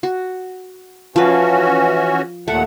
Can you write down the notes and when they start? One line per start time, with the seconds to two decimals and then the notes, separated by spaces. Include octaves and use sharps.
0.03 F#4
1.16 E3 F3 C#4 F#4 B4
2.48 D#2 A#2 A3 F#5